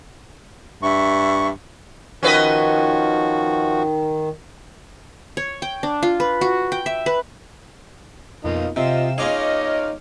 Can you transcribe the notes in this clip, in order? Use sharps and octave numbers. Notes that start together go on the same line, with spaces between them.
G2 E5 C#6
D#3 F3 C#4 F#4 B4 D#5
C#5
G5
D4
F4
B4
F#4
G5
E5
B4
F2 B2 A#3 D#4 F4
C3 C4 F4 D#5 F5 E7
C#4 D#4 F4 G#4 C#5 D#5 D6 F6